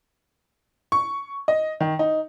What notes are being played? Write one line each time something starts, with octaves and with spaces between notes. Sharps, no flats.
C#6
D#5
D#3
D#4